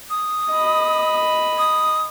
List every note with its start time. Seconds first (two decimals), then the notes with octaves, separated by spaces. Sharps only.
0.10 D#6
0.51 D#5 B5
1.58 D#6